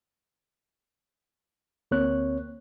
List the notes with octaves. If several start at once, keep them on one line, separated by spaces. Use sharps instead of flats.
D2 A#3 C4 C#5 F#6